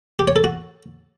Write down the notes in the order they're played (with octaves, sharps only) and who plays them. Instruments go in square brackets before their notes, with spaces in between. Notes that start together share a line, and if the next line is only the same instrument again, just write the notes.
[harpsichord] G4
C#5
A4
F#4